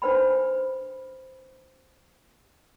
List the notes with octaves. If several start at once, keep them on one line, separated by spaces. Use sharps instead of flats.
D4 B4 C5 G5 B5